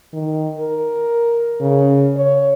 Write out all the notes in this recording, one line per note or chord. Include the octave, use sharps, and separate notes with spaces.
D#3
A#4
C#3
C#5